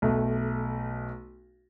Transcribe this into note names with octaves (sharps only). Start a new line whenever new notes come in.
B1 A3